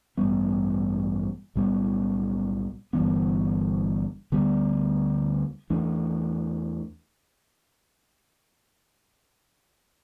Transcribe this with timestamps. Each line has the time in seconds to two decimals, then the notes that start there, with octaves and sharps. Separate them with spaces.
0.17 A1 G2 G3 B3
1.56 B1 A2 G3 B3
2.93 G1 G2 E3 B3
4.32 D2 D3 G3 B3
5.70 E2 E3 A3 D4